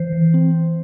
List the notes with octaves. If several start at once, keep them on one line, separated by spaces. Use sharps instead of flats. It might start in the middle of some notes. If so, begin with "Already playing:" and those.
Already playing: E3 C5
E3
C4